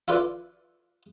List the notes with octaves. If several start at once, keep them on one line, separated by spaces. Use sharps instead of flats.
E4 F4 A4 B4 D5